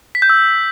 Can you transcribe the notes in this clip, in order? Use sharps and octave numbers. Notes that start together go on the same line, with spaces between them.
B6
G6
E6